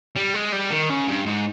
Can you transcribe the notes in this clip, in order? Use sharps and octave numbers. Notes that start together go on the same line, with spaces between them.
G3
G#3
G3
D#3
C#3
G2
G#2